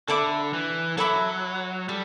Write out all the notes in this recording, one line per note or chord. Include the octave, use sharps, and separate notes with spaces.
D3 A4 E5 B5 D6
E3
F#3 A4 E5 B5 D6
G3 A4